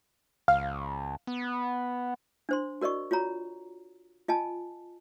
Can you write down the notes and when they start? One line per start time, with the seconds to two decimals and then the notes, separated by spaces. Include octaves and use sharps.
0.48 C#2 F5
1.27 B3
2.49 D4 C5 C6
2.81 F#4 A#4 D5 D#5 C#6
3.11 F4 F#4 C#5 A#5
4.28 F4 D#5 G#5 A5